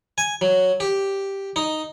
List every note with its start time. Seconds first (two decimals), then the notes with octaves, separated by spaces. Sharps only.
0.18 G#5
0.41 F#3
0.80 G4
1.56 D#4